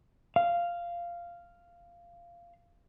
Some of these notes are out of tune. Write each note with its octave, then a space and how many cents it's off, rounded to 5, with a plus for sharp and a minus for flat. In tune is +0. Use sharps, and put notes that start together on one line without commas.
F5 -10